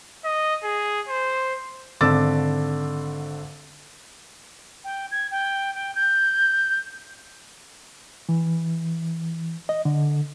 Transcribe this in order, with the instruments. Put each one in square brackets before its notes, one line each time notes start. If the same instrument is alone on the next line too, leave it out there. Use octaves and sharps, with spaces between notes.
[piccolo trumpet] D#5
G#4
C5
[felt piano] G#1 D3 D6 E6 A6
[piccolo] G5
G#6
G5
G5
G6
[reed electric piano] E3
D#5
D3